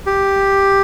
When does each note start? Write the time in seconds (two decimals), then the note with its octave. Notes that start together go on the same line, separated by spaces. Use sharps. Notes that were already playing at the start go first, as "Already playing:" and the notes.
0.06 G4